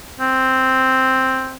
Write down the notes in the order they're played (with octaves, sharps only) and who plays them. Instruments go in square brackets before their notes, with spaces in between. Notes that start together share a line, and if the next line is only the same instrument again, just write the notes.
[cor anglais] C4